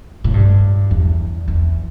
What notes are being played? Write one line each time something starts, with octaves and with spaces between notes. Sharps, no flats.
A2
G2
E2
E2